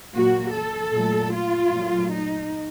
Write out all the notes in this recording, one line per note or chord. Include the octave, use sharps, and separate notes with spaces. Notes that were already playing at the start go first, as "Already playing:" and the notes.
A#2 F#3 A#3 F#4
A4
A#2 F#3 A3
F4
A#2 F#3 A3
D#4